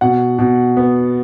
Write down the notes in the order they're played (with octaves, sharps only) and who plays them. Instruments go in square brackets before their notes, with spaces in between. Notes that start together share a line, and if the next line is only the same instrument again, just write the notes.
[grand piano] B2 F#5
B2
B3